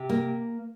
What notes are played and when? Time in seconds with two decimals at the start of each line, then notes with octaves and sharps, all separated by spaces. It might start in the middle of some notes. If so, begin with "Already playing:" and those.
Already playing: C3
0.09 A#3